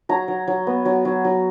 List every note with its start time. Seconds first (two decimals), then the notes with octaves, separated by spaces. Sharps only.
0.09 F#3 A#5
0.28 F#3
0.48 F#3
0.67 B3
0.85 F#3
1.05 F#3
1.25 F#3